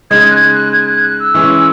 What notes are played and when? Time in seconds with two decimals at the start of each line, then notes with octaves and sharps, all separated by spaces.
0.11 C#3 G#3 D#4 G#6
0.31 F#6
0.52 F#6
0.73 G#6
0.88 F#6
1.04 F#6
1.20 E6
1.34 E3 G#3 C#4